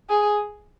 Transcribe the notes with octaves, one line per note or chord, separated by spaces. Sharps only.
G#4